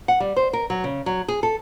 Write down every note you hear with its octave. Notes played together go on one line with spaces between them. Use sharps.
F#5
G3
C5
A#4
F#3
C#3
F#3
G#4
A4